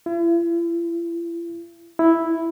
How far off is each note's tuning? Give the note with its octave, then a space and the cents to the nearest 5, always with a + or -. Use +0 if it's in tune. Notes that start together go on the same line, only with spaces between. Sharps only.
E4 +45
E4 +0